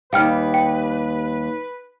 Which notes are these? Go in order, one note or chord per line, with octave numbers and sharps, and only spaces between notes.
D#2 G3 B4 F5 G5 F6
G5